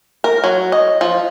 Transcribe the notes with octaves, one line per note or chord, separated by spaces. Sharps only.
A#4
F#3
D#5
F3